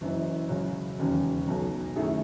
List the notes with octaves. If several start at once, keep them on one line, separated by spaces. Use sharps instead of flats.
F#1 F#2 E3
C#2 C#3 F#3
E1 D#2 C#3 F#3 C#4
B1 B2 F#3
F#2 D#3 A3 E4 G#4